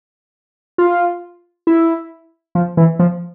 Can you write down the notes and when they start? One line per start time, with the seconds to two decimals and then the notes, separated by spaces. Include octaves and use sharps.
0.78 F4
1.67 E4
2.55 F3
2.77 E3
2.99 F3